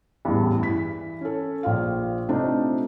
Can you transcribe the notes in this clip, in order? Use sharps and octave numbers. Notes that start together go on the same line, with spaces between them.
A1 E2 G2
E3 B6
C#4 A4
A#1 F4 F5
C3 A3 C4 D4 D#4 F4